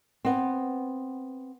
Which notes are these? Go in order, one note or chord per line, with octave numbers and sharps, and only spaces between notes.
B3 C4